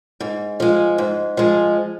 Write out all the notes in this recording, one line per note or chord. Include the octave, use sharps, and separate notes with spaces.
G#2
F3 G#3
G#2
F3 G#3